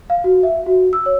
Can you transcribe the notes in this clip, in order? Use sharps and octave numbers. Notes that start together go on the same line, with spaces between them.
F5
F#4
E5
F#4
E6
C#5